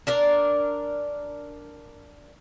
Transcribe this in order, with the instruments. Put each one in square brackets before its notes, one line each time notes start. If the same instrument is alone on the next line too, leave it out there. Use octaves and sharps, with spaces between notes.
[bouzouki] D4 A#4 D5